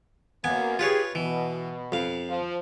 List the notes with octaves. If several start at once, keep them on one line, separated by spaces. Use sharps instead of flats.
F#2 A#3 B3 G#5
F4 G4 G#4 B4 C#5
B2 E3
F2 F5
F3